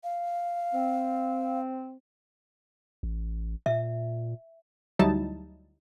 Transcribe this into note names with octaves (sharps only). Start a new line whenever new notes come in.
F5
C4
A1
A#2 E5
D2 F#3 G3 D#4 E4 A5